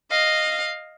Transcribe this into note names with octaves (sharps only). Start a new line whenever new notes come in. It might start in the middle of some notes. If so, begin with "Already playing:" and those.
D#5 F5